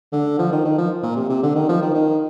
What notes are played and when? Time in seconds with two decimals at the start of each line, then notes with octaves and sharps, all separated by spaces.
0.12 D3
0.38 F3
0.52 D#3
0.65 D#3
0.78 F3
1.03 A#2
1.17 C3
1.29 C3
1.43 D3
1.55 D#3
1.69 F3
1.82 D#3
1.94 D#3